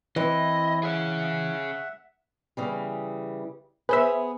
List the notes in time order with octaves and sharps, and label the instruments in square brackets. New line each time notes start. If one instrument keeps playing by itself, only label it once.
[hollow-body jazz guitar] E3 [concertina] C4 E4 [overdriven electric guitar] D#5
[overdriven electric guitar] G#4 C#5 [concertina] E5 F#5
[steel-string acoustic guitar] C#3 E3 G3
[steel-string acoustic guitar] B3 G#4 [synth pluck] B4 C5 E5